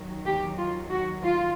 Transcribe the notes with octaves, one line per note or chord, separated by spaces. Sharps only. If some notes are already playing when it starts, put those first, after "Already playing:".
Already playing: D#2 D#3 F#3
G4
F4
F#4
F4